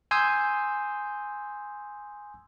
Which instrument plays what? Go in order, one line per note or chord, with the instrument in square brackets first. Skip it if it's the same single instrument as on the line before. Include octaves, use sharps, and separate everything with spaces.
[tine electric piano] G#5 C6 D#6 E6 G6 G#6